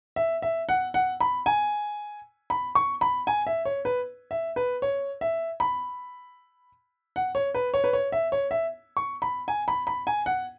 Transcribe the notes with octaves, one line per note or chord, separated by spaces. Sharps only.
E5
E5
F#5
F#5
B5
G#5
B5
C#6
B5
G#5
E5
C#5
B4
E5
B4
C#5
E5
B5
F#5
C#5
B4
C#5
B4
C#5
E5
C#5
E5
C#6
B5
G#5
B5
B5
G#5
F#5